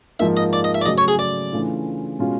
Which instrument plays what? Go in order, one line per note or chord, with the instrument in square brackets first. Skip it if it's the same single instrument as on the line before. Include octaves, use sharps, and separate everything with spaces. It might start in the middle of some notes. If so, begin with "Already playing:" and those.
[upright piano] G#2 F3 A#3 D#4 [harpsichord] E5
[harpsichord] D#5
D5
D#5
E5
D5
[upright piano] C#3 F#3 A3 [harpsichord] D#5
[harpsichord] C#5
G#4
D5
[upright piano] C#3 E3 A3 D4 F4
B2 G#3 C#4 F4